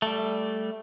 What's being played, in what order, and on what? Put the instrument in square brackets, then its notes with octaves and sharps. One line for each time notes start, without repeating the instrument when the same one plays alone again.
[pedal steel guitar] G3 A3